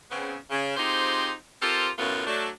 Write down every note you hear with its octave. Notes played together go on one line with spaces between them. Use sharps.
C#3 B3 C4
C#3
C4 D#4 F4 G4 G#4 C5
C4 F4 G4 A4 A#4 C5
F#2 A2 A3 B3 F4
F#3 A3 D4